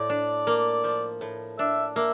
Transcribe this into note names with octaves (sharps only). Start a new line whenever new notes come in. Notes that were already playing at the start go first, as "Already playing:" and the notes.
Already playing: A2 D5
D4
A#3
F3
A2
D4 E5
A#3 E5